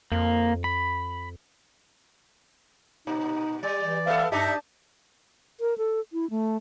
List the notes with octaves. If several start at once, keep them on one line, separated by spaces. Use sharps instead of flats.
F2 A#3
B5
A#2 D#4
G3 D5
E3
B3 A4 E5 F5
G2 D4 D#4 G4 E5 A5
A#4
A4
E4
A3